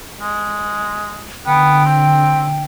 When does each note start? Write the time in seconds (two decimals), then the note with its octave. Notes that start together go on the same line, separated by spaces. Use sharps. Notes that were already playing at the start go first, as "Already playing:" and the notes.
0.21 G#3
1.46 D3 B3 G5
1.85 C4